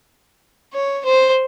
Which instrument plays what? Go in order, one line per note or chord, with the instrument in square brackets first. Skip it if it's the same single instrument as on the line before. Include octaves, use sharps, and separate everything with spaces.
[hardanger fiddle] C#5
C5